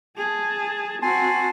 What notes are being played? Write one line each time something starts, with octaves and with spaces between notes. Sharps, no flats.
G#4 A5
C4 F#4 G#5 A5 C6